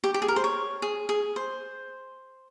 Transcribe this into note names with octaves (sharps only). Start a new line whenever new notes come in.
G4
G4
G#4
A#4
C5
C#5
G#4
G#4
C5